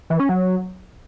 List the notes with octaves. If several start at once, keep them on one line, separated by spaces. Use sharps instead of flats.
E3
C#4
F#3